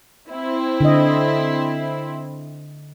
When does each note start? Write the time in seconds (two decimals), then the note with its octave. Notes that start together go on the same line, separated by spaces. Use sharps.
0.30 C4 E4
0.80 D3 D#5